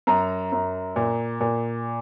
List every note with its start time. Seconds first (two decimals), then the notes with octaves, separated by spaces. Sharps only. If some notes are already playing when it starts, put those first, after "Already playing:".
0.07 F#2 A#5
0.52 F#2
0.96 A#2
1.41 A#2